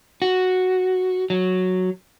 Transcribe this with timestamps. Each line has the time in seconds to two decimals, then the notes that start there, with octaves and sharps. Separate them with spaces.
0.22 F#4
1.30 F#3